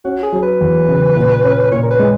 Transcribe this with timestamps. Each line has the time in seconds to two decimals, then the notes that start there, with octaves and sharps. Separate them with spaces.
0.05 C#4 F#4
0.23 G#4
0.33 F#3
0.43 B4
0.61 E2
0.89 C#3
1.17 A#2
1.44 C#4
1.71 A#2 C#5
1.83 A#4
1.91 B4
1.99 G#3